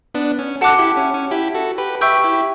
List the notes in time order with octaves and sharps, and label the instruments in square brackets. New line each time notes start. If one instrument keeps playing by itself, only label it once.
[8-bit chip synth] B3 D4
C#4
[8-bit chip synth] F#4 A4 [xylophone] F#5 A5 D6 F#6
[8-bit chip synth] E4 G4
C#4
C#4
E4 G4
F#4 A4
G4 B4
[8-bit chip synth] G4 B4 [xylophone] E5 G5 C#6 E6 G6
[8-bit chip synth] E4 G4